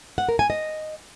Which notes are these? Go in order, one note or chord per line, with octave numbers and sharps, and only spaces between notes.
F#5
A#4
G#5
D#5